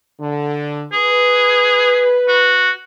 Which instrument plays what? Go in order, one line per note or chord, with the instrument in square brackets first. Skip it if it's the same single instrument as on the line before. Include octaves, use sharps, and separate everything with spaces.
[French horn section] D3
[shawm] G#4 [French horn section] B4
[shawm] F#4